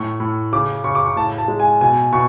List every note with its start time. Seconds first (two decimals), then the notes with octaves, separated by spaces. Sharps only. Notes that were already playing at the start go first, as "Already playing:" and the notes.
Already playing: A2 C#6
0.20 A2
0.52 C#3 D6
0.84 C#3 C#6
0.95 D6
1.05 C#6
1.16 A2 A5
1.38 A5
1.48 G#3
1.60 G#5
1.81 B2 G#5
2.12 B2 C#6